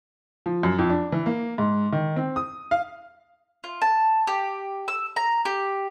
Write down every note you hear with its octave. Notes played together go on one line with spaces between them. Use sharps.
F3
F#2
F2
D4
E3
A#3
G#2
D#3
C4
D#6
F5
F4
A5
G4
E6
A#5
G4